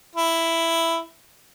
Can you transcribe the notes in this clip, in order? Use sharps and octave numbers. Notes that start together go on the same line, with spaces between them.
E4